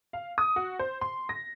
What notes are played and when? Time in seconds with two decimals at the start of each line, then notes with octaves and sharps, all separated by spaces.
0.13 F5
0.38 D#6
0.56 F#4
0.79 C5
1.01 C6
1.29 A#6